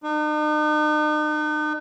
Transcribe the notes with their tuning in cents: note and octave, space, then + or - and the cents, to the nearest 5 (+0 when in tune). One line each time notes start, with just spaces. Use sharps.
D#4 -45